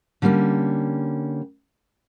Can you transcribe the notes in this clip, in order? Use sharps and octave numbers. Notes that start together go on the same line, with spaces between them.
D3 G3 A#3 C4 C#4